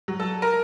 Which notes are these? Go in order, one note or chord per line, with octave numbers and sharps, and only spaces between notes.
F#3
A4
A#4